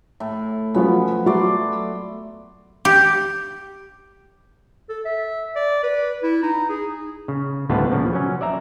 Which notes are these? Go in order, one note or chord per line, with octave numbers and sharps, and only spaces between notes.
A2
F3 F#3 B3 C#4
F#3 A3 D5 C6
G4
A4
E5
D5
B4
E4
D#4
G#4
C#3
D2 A2 G3 B3 F4 A5
A#2 C#3 F3
F#3 C#4
D5 E5 A#5